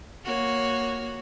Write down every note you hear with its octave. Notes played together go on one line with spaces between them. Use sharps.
A#3 F#4 C#5